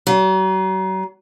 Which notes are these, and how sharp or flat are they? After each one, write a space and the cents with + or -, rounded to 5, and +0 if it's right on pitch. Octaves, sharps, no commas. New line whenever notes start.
F#3 +40